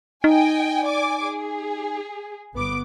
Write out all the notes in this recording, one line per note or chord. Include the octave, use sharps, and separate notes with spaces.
D#4 D#5 G5 G#5
D5 G#5 D6
G#4
G1 B3 D6